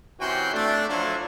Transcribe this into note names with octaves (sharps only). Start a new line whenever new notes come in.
C3 E3 C#4 F#4 G5 C6
A3 D4
F3 F#3 A3 D4 E4 F4